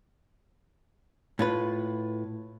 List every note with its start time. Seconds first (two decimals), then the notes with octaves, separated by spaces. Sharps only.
1.39 A2 F4 B4